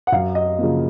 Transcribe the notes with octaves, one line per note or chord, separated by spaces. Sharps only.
F#5
F#2 F5
D#5
C#3 F3 A#3